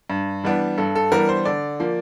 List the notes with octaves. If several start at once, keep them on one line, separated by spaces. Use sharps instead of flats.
G2
E3 G3 B3 D4
G2 A4
A4
E3 G3 B3 D4 A#4
C5
D3 D5
F3 A#3